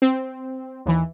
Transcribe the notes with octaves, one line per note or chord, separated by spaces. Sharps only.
C4
D#2 E3